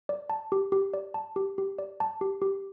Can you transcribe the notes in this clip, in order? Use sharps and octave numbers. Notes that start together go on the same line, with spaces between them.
D5
A5
G4
G4
D5
A5
G4
G4
D5
A5
G4
G4